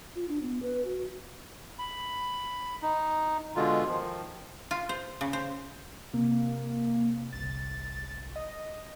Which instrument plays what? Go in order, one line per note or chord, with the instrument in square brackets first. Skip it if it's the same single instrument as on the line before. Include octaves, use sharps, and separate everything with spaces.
[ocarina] F4
D4
B3
B4
F#4
[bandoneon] B5
D#4
B2 D3 G#3 F4
D#3 F3
[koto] F4
C5
C#3
C5
[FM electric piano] C3 [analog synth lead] A#3
[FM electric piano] G1 C2 [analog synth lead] A6
[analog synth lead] D#5